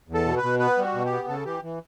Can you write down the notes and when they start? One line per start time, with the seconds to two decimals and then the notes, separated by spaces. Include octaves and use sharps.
0.09 E2
0.14 A4
0.26 B2
0.37 B4
0.43 B2
0.59 B3 B4
0.78 G3 F#4
0.94 B2
1.05 G4
1.11 B3
1.28 C#3 A4
1.45 E3 G4
1.63 E3